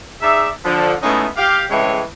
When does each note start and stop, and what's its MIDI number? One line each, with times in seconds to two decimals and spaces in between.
0.21 0.48 63
0.21 0.48 68
0.21 0.48 74
0.21 0.48 76
0.65 0.94 50
0.65 0.94 53
1.03 1.26 56
1.03 1.26 57
1.03 1.26 59
1.03 1.26 61
1.03 1.26 63
1.03 1.26 64
1.37 1.63 67
1.37 1.63 77
1.70 2.01 45
1.70 2.01 49
1.70 2.01 52
1.70 2.01 56
1.70 2.01 60
1.70 2.01 73